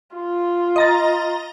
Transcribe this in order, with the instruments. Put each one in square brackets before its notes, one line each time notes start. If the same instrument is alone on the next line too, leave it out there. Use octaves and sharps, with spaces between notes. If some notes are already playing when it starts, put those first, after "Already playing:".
[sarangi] F4
[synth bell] D#5 A#5 A6